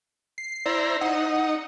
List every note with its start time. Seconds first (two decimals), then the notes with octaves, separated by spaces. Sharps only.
0.38 C7
0.66 E4 C5 D5 A#5
1.01 D#4 F#5